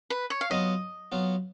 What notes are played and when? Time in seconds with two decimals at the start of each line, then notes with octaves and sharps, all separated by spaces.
0.10 B4
0.30 C#5
0.41 F5
0.50 F#3 B3 F4 D#5
1.12 F#3 B3 F4